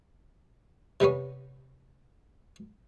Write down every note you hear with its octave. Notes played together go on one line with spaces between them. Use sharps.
C3 G3 B3 C#4